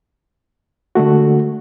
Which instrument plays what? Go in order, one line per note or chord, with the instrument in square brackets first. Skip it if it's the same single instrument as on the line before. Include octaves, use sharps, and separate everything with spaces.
[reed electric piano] D3 G#3 A3 F#4